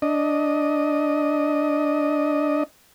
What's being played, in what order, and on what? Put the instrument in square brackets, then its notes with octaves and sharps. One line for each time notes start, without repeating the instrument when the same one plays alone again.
[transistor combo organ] D4 D#5